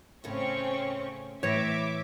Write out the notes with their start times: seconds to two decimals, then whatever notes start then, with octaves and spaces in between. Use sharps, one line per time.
0.24 A2 C#3 C4 C#4 C#6
1.43 A2 E3 C#5 E5 D6 A#6